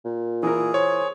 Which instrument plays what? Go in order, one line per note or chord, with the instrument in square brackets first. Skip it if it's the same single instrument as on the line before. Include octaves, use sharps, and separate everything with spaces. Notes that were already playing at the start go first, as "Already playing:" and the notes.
[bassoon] A#2
[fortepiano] E3 A#4 [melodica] G#4
[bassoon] C5 [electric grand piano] C#5